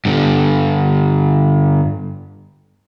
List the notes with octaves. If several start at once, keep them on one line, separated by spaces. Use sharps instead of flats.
G2 D3